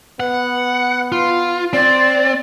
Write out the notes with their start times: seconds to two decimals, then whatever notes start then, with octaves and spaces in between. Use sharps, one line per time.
0.20 B3 F#5
1.12 F4
1.73 C4 D5